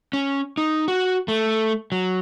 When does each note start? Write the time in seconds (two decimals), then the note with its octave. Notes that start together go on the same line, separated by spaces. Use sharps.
0.13 C#4
0.58 D#4
0.88 F#4
1.28 A3
1.92 F#3